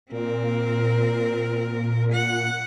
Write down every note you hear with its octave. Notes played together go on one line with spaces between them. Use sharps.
A#2 C4 A#4
F#5